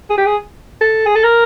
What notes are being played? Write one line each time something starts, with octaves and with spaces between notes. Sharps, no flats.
G#4
G4
G#4
A4
G#4
A4
A#4